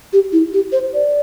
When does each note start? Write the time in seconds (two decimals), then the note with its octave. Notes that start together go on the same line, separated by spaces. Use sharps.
0.13 G4
0.33 E4
0.53 G4
0.72 C5
0.94 D5